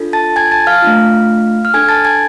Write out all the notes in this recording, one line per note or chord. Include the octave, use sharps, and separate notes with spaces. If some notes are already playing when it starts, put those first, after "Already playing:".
Already playing: D4 F4 A4
A5 A6
G#5 G#6
A5 A6
F5 F6
A3 D4 F4
F6
D4 A4 G#5 G#6
A5 A6
G#5 G#6